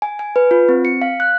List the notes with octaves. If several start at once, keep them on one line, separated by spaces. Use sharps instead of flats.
G#5
G#5
B4
F4
C4
C#7
F5
F#6